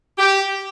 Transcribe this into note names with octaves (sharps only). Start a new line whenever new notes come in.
G4